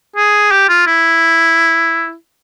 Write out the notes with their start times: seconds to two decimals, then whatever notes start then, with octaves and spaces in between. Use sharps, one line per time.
0.16 G#4
0.52 G4
0.69 F4
0.87 E4